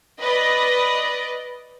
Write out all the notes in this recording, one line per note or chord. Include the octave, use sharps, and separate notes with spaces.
B4 D5 D#5